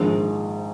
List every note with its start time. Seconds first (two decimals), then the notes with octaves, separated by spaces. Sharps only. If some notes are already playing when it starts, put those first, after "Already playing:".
Already playing: A#1 G#2 D#3 G#3 D#4